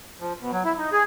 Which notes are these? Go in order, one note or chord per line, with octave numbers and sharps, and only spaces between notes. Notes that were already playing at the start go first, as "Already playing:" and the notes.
F3
B2
F#3
E4
D#4
G#4